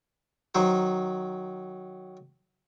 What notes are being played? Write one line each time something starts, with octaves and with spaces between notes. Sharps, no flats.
D#3 F#3 C5